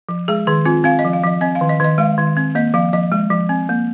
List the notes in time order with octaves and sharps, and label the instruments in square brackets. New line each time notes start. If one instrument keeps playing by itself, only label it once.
[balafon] F3
G#3 G#4
D#3 G#4
C4 F4
C4 F5
D#5
F3
F5
F3 D#5
C4 D#5
F5
D#3
D#5
D#3 D#5
G#3 F5
D#3
C4
A#3 D#5
F3 F5
F3 D#5
G#3
F3
C4
A#3